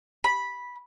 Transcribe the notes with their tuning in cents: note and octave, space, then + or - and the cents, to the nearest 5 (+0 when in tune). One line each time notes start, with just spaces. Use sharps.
B5 -10